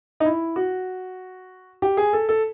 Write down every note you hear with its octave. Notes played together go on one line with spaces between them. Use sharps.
D#4
E4
F#4
G4
G#4
A4
A4